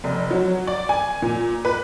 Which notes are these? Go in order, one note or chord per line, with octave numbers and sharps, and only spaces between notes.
F1
F#3
D5
G#5
A#2
B4